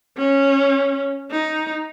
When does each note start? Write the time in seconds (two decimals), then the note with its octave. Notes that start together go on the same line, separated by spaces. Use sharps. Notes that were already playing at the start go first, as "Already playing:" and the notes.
0.18 C#4
1.31 D#4